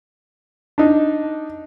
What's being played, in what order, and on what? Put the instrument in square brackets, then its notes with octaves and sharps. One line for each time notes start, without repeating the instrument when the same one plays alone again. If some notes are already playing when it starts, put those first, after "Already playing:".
[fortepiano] D4 D#4